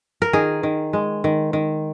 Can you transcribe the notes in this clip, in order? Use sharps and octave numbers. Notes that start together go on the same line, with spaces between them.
A#4
D#3 G#4
D#3
G#3
D#3
D#3